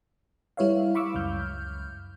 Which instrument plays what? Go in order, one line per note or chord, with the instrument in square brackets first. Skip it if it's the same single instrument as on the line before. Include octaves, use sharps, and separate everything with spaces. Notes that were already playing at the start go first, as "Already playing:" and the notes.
[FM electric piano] G3 E4 B4 C#5 E5 F5
F5 B5 C#6 D6 E6
C#2 F#2 F6 G6